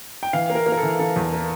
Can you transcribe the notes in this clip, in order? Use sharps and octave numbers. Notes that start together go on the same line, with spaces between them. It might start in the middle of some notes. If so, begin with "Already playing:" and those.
G5
E3 F5
A#3
A#4
A#3
A#4
A4
E3
E3 A4
E2
A#3